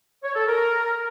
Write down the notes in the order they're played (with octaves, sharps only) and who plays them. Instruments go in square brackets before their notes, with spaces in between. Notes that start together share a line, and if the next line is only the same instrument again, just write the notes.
[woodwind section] C#5
A4
A#4